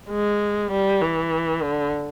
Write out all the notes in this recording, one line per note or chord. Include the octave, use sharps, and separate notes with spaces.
G#3
G3
E3
D3